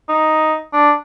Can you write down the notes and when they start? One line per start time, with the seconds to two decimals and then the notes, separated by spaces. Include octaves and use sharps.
0.09 D#4
0.73 D4